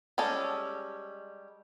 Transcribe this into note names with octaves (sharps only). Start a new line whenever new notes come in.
G3 G#3 C#4 A4